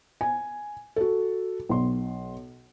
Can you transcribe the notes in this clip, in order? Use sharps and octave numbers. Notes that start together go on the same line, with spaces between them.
G#5
F#4 A4
B1 C6